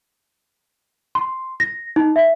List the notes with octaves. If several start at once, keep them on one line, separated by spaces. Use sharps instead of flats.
C6
A#6
D#4
E5